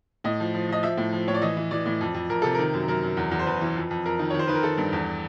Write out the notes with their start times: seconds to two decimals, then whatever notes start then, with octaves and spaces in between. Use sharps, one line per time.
0.24 A2 D#5
0.40 F3
0.54 F3
0.69 F3 D#5
0.83 F3 E5
0.97 A2
1.13 F3
1.28 A2 C#5
1.34 D5
1.42 E3 D#5
1.57 E3
1.71 E3 D5
1.86 A2
2.01 F2
2.14 F2
2.30 F2 A#4
2.42 C3 A4
2.54 D#3 A#4
2.74 F#2
2.88 F#2 A#4
3.03 F#2
3.17 E2
3.31 E2
3.39 C5
3.47 E2 B4
3.61 E3
3.76 F2
3.91 F2
4.06 F2 A#4
4.19 D#3
4.30 C#5
4.34 D#3
4.39 C5
4.48 D#3 B4
4.55 A#4
4.63 D#3 A4
4.78 G2
4.93 E2